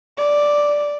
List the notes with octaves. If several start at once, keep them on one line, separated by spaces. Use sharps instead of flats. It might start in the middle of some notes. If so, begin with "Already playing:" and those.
D5